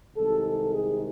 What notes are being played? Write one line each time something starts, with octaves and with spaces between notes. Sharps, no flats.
C2 C3 D#3 G#3 A4
A4
G#4